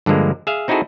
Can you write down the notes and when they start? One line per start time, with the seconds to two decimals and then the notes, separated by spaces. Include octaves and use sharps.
0.06 G2 D3 F3 G#3 A#3
0.47 G#4 E5 F5
0.68 C4 D#4 E4 F#4 G#4 A4